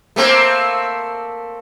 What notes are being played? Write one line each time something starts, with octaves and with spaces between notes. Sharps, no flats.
A3 A#3 C4